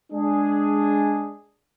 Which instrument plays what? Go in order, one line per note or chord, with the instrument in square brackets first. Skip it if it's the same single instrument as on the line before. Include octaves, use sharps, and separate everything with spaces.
[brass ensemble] G#3 D4 G#4